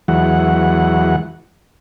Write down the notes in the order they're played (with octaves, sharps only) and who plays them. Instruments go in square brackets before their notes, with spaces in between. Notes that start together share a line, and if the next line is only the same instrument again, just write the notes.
[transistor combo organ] E2 E3 F#3 G#3 F#5